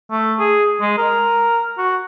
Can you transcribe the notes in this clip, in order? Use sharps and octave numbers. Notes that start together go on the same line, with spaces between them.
A3
G#4
G#3
A#4
F#4